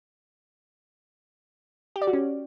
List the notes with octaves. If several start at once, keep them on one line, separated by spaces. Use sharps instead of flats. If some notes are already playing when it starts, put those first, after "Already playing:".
G4
D5
F#4
C#4